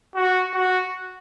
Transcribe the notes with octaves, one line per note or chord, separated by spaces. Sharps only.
F#4
F#4